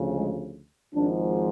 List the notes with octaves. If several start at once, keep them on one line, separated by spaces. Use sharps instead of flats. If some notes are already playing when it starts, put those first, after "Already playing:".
Already playing: D2 C#3 F3
G#3
G#1 G#2 F3 D4